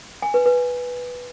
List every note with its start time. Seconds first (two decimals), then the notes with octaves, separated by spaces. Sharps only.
0.22 G#5
0.34 B4
0.46 B4